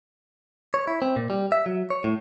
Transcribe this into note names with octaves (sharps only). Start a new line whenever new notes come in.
C#5
E4
C4
A#2
G3
E5
F#3
C#5
A2